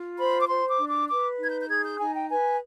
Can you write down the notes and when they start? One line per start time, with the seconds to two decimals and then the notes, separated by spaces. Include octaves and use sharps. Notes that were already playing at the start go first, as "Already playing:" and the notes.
Already playing: F4
0.18 C5 B5
0.41 D6
0.48 C5 C6
0.69 D6
0.79 D4
0.89 D6
1.08 B4 D6
1.39 D#4 G#6
1.50 G6
1.61 G6
1.69 G#4 G#6
1.84 G6
1.99 D#4 G#5
2.14 G5
2.30 B4 G#5